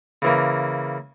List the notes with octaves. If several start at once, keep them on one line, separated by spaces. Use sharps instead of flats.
C#3 E3 A#3